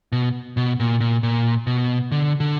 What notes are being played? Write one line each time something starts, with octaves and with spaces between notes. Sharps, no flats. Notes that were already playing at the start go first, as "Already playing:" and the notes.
B2
B2
A#2
A#2
A#2
B2
D3
D3